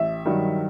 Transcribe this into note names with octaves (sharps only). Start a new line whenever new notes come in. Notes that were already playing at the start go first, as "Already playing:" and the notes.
Already playing: A1 E5
G2 D#3 F#3